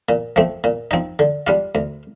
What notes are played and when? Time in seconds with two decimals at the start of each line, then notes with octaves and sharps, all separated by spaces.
0.09 A#2
0.36 F3 A3 C4
0.64 A#2
0.91 F3 C4 D#4
1.19 D3
1.47 G3 D4 F4
1.75 D2